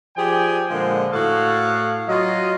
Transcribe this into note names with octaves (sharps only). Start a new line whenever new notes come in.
F3 G4 G#4 D5 G5 G#5
A#2 D3 F3 G#3
A2 F#4 A4 F5
F#3 F4 F#4 D#5